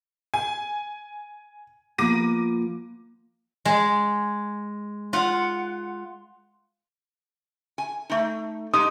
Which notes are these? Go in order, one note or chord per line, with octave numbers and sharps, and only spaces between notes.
G#5
F3 A#3 B3 D6 A#6 D#7
G#3
F4 F#5
G#5
A3 D#4
G#3 D#4 G4 D#6